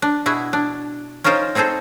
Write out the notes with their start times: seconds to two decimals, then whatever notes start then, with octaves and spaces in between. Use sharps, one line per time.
0.02 D4
0.26 B2 E4 F#4 G#4
0.53 D4
1.24 C#4 D#4 F4 A#4 C5
1.55 C4 D#4 G#4 A4 C5